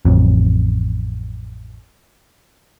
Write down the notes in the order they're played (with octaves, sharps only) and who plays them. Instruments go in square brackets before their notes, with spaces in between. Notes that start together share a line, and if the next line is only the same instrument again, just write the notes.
[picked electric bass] A1 F2